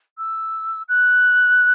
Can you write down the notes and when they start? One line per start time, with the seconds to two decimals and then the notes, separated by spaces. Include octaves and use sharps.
0.18 E6
0.88 F#6